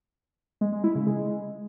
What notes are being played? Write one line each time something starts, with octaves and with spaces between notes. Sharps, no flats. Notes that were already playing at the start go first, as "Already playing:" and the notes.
G#3
G#3
E4
C#3
G#3